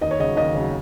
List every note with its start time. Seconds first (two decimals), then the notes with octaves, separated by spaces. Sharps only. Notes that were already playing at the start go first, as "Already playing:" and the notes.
0.01 D#2 D#5
0.11 C#5
0.19 C#3 D#5
0.24 F#3
0.37 D#2 D#5
0.54 C#3 F#3